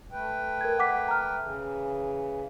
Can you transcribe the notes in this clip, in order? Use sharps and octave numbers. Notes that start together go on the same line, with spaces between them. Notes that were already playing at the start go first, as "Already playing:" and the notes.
A3 B4 G5
A#4 G#6
F#5 D6 B6
A#5 F6
C#3 E3